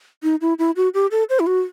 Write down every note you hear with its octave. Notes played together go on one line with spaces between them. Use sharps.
D#4
E4
E4
F#4
G4
A4
C5
E4
F#4